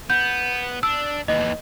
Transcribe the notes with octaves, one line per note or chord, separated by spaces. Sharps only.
B3 G6
D4 E6
D#2 E3 D#5